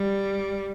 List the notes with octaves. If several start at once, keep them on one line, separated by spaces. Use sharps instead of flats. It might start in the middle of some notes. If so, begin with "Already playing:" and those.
Already playing: G3